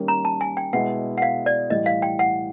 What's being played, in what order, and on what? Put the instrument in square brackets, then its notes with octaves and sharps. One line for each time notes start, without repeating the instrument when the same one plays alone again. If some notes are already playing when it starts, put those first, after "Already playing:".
Already playing: [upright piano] D#3 G3 A#3 C#4
[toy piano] A#5
A5
G#5
G5
[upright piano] B2 G#3 B3 E4 [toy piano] F#5
[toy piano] F#5
F5
D5
[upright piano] A2 E3 G3 [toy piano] D#5
[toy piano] F5
G5
F#5